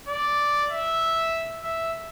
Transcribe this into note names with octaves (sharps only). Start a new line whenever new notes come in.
D5
E5
E5